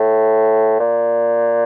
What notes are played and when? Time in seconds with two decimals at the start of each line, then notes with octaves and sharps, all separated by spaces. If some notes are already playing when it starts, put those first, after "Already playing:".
Already playing: A2
0.79 A#2